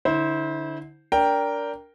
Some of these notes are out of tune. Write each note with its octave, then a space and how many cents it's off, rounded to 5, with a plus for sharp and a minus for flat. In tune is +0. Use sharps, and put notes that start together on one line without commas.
D3 +0 E4 -30 C5 +0
D4 -20 A#4 +0 G5 +0